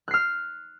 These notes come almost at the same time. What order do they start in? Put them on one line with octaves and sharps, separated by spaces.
F#6 C7 F6